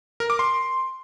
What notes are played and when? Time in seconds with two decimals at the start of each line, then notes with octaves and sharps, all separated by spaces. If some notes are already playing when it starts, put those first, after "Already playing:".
0.20 A#4
0.30 D6
0.39 C6